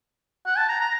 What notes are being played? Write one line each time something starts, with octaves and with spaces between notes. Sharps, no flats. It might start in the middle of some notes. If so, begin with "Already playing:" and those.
F#5
A5
A#5
A#5